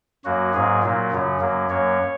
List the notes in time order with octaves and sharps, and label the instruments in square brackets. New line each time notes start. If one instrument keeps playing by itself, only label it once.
[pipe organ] F#2 F#3 A#3 F#4
G#2 F#3 A#3 G#4
A#2 F#3 A#3
F#2 C#3 F#3
F#2 F#3 A#3
F#2 F#3 A#3 C#5